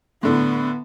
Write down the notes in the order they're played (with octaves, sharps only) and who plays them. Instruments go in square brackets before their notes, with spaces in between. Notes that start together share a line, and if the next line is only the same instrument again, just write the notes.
[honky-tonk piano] A2 D3 [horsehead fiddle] B3